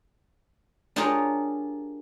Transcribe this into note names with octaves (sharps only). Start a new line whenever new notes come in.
D4 F4 G4 G#4 A#4 C#5